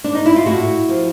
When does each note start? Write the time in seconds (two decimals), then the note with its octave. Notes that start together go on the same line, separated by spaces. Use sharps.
0.04 D4
0.15 D#4
0.26 E4
0.36 F4
0.46 A2 E4 F#4
0.89 F3